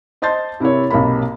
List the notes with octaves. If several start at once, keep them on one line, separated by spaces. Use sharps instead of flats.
C5 D#5 A5 C6 G6 A6
C3 E4 A#4 C#5
B1 C3 A#3 B5